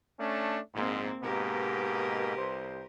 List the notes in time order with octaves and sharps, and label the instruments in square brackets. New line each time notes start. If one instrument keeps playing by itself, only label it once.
[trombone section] A3 C#4 D4
[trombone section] A#1 G#2 [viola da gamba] A#3 C4
[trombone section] G#2 B2 A#3 [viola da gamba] G4 A#4 B4
[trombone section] C2 C5